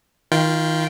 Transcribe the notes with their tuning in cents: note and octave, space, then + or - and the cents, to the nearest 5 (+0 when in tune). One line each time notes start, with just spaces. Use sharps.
D#3 +30 F4 -5 G5 +0